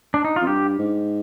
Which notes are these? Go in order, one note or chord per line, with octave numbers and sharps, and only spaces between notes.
D4
D#4
F2 F4
G2 G4
G#2